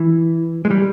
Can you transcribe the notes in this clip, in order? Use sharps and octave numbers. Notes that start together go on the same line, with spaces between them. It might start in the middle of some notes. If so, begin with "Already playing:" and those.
Already playing: E3
G#3
G3